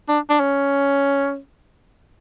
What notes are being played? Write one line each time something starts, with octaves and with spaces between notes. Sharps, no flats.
D4
D4
C#4